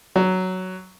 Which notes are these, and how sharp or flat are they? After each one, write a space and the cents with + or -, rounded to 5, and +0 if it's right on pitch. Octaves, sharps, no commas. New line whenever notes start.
F#3 +5